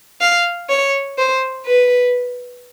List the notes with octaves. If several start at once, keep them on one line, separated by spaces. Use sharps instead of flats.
F5
C#5
C5
B4